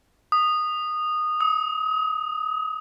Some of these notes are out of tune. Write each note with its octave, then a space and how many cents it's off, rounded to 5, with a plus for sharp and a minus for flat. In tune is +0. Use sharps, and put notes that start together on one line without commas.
D#6 -15
D#6 +35